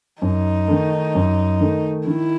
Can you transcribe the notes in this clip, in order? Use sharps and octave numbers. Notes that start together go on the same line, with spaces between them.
F#2 D#4
D#3 A3
F#2
D#3 A3
D#3 E4